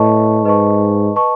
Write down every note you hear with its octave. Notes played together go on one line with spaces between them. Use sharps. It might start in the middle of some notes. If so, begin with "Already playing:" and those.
Already playing: A2 B4 D#5 A5 C#6
G#2 B4 D#5 A5 C#6
B4 D#5 A5 C#6